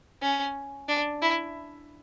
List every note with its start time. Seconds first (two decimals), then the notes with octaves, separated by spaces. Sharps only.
0.21 C#4
0.88 D4
1.22 E4